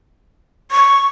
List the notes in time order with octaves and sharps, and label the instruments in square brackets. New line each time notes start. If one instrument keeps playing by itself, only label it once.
[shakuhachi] C#6